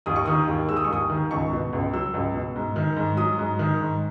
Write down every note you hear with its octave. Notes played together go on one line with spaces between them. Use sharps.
D#2 D#6
C#6
D#3 D#6
D#2
G#3 E6
D#6
C#6
D#2 D#6
D#3
C#2 C#6
B2
C#2
F#3 E6
C#2
B2
G#2
D#3
G#2
F#3 D#6
G#2
D#3
G#2